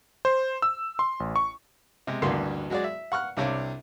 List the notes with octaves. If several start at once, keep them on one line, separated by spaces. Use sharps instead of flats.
C5
E6
C6
A1
C#6
C3 G#3
A1 D2 G2 A#3 F#4 C6
F#3 G#3 F#4 G#4 D5
E5
F#5 C#6 F6 F#6
C2 C3 D4 C#5 F5